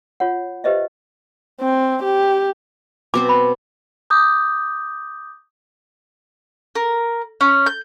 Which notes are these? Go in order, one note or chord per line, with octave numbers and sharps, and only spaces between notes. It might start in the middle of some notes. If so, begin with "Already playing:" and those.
F4 C#5 F#5
G4 B4 C5 D#5 E5
C4
G4
B2 C4 C5 D6
B5
D6 D#6 G6
A#4
C#4
G6